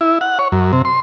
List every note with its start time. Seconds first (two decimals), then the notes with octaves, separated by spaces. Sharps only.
0.01 E4
0.21 F#5
0.39 C#5
0.52 F#2
0.73 C3
0.85 C6